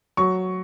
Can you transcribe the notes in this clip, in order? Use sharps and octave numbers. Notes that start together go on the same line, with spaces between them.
F#3 C#6